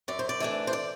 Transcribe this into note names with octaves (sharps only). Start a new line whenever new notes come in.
F#2 D5
C5
D5
E3 A3 D4
C5
D5